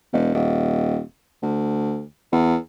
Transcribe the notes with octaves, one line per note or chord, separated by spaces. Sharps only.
E1
D#1
D2
E2